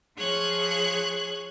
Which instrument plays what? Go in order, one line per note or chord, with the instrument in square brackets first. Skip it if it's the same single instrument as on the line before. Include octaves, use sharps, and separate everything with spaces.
[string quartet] F3 G#4 C#5 F#6 G#6